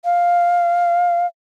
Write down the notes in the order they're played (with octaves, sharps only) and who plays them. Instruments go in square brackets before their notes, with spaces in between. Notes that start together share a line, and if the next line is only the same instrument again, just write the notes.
[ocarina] F5